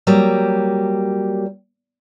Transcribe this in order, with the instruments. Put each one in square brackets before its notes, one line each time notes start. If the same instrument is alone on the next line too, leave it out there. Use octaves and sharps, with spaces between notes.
[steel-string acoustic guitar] F#3 G3 A#3